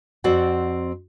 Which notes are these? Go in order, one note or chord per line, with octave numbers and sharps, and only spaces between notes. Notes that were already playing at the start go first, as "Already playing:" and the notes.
F2 C4 F#4 D5 F#5